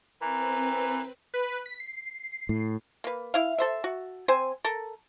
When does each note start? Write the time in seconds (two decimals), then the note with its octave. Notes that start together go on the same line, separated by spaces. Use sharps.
0.22 E3 C4 A#4 B4
1.34 B4
1.66 B6
1.80 C7
2.49 A2
3.04 A#3 B4
3.34 E4 F5
3.58 A4 C5 E5
3.84 F#4
4.28 C4 C5 G#5
4.65 A4 A#4